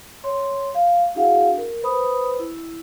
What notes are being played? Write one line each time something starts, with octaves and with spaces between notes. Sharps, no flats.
C#5 C6
F5
D4 E4 F#4 G#4 F5 F#5
A#4
B4 C5 B5 D#6
E4